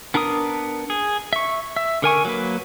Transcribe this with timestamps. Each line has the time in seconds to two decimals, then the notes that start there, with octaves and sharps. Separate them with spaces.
0.14 B3 D4 A#4 A#5 D#6
0.90 G#4
1.33 E5 C#6
1.76 E5
2.02 D3 A#4 G#5 C#6
2.25 F#3 A#3 B4